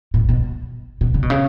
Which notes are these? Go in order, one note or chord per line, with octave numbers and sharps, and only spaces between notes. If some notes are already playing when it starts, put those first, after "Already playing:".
A2
B2
B2
C#3
B2
C#3